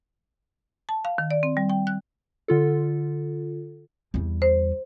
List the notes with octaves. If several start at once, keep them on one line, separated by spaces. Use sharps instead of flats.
A5
F5
D#3
D5
C4
G3
G5
F#6
D3 F4 A4
E2 G3
C5